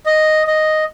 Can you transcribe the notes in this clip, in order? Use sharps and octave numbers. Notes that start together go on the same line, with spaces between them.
D#5
D#5